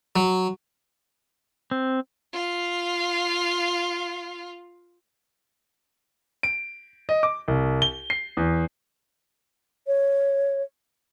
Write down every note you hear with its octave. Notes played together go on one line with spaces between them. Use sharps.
F#3
C4
F4 F5
D7
D#5
D6
C2
G7
C7
E2
C#5